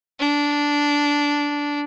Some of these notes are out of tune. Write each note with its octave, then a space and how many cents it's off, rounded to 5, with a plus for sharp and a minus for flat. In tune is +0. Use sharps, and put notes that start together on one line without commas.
D4 -10